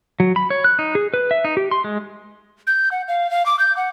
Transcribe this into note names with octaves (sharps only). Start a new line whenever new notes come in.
F#3
B5
C#5
F#6
D#4
G#4
B4
E5
D#4
G4
C6
G#3
G6
F#5
F5
F5
D6
G6
F#5